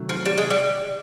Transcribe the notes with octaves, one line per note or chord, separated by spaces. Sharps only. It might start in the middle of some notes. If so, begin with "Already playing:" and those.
Already playing: C3 D#3 F#3 A3
F3
G3
G#3
G3